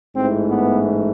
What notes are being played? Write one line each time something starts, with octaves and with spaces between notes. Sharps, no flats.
A1 G#2 E3 A3 C4
B3